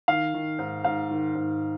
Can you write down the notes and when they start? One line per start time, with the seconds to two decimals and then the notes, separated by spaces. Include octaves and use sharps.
0.08 D#3 F5
0.34 D#3
0.59 G#2
0.84 G#2 F5
1.10 D#3
1.35 G#2